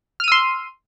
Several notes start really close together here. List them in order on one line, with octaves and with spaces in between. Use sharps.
F6 D#7 E6 C6